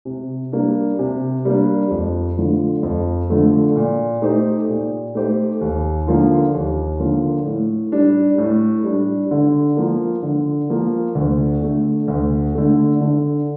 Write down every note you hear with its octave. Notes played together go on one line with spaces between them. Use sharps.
C3
G3 A#3 D4
C3
G3 A#3 D4
F2
D3 F3 A3
F2
D3 F3 A3
A#2
A3 D#4 G4 C5
A#2
A3 D#4 G4 C5
D#2
D3 F3 A#3 F4
D#2
D3 F3 A#3 F4
A2
G3 D4
A2
G3 D4
D3
F3 A#3
D3
F3 A#3
D2
D3 A3
D2
D3 A3
D3